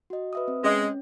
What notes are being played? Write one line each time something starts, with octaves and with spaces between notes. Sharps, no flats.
F#4 D#5
B4 E5 D#6
C4
G#3 C#4